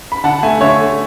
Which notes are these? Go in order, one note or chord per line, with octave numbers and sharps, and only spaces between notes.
B5
D3 F#5 A5
A3 E5 G#5
D3 C#5 E5
A3